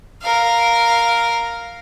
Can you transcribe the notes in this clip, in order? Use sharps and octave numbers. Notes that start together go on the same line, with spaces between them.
A#4 F5